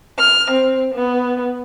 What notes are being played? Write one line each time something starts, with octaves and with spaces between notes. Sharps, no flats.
F6
C4
B3